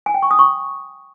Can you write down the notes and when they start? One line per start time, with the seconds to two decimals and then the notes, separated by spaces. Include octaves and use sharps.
0.06 G#5
0.14 G5
0.22 C#6
0.31 D#6
0.39 C#6